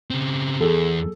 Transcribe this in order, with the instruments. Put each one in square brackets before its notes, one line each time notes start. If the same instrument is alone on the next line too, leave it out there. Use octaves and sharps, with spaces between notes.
[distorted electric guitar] C#3 C4
[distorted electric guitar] E2 [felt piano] G#4 A4